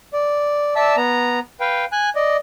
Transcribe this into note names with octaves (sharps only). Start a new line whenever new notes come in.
D5
D5 E5 A5 E6
B3 A#5
B4 F5 G5
G#5 F#6
D5 D#5